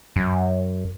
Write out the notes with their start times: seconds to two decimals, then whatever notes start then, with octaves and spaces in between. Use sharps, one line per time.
0.16 F#2